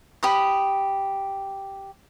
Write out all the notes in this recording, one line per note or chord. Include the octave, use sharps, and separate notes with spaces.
G4 B5 D#6